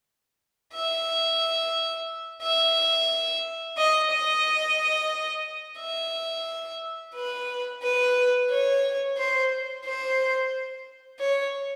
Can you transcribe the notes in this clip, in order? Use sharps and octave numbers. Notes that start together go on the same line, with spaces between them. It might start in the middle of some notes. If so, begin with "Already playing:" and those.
E5
E5
D#5
D#5
E5
B4
B4
C#5
C5
C5
C#5